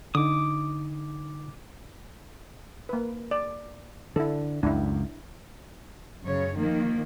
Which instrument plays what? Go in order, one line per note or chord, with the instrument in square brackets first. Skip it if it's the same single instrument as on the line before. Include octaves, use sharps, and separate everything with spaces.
[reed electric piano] D3 D#4 [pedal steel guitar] D6 D#6
[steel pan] A#3 B4
D5
[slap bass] D3 [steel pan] E4 A4
[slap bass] C#2 F#2 [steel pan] D4 E4
[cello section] F#2 C#3 C#5
D#3 F3 A#3